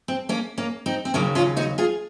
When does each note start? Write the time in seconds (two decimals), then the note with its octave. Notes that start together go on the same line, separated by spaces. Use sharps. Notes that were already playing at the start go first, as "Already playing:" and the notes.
0.08 C4
0.29 A#3 C#4
0.58 A#3 C#4
0.86 C4 D#4
1.05 C4
1.14 D#2 C#3 F#3 A#3 C#4
1.35 C#4 F4
1.56 D#4 F#4
1.78 F4 G#4